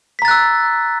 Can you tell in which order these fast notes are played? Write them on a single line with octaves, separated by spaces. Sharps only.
B6 A#5 A6 F#6 E6